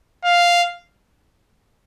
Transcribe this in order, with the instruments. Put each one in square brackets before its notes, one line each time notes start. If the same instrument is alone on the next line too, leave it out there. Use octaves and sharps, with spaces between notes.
[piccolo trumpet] F5